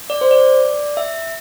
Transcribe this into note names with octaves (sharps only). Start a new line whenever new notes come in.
D5
C5
D5
E5